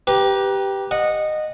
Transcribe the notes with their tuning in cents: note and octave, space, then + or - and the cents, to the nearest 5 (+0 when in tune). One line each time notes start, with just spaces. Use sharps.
G4 +0 B4 +0 A#5 +35
D#5 -15 F#5 -15